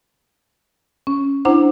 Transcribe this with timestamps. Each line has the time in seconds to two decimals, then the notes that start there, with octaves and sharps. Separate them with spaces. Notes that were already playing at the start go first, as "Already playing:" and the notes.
1.07 C#4
1.45 D4 E4 C5 F#5 A#5